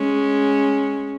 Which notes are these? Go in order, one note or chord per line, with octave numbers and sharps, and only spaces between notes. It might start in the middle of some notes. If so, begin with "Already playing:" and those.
Already playing: G#3 C#4